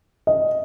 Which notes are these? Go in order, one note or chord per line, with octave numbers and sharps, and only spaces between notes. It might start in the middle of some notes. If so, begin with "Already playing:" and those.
D#5